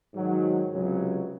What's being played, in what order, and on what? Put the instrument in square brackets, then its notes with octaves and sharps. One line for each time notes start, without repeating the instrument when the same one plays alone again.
[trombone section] G#2 D#3 F#3
C#2 C3 F#3